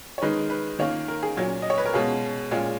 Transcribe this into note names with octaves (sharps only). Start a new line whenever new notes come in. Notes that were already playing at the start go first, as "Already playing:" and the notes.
C#5
D#3 G#3 D#4 B4
B4
D#3 A#3 C#4 F4 C#5
A#4
G#4
A#2 F#3 C#4
D#5
C#5
B4
A#4
B2 G#3 C#4 F4 G#4
A#2 G#3 C#4 F4